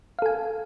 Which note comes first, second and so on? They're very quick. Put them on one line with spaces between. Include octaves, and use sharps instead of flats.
F5 A4 G#5